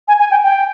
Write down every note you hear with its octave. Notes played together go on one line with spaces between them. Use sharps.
G#5
G#5
G5
G5